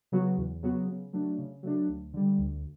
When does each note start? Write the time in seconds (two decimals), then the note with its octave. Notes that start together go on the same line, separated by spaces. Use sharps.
0.12 C#3 F#3 B3 F#4
0.38 E2
0.63 C#3 F#3 B3 F#4
0.88 C#3
1.13 F#3 A3 D4
1.38 C#3
1.63 F#3 A3 D4
1.88 D2
2.14 D3 G3
2.38 D2